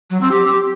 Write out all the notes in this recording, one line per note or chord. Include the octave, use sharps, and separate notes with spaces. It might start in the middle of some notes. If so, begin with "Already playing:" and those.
F#3
C4
G4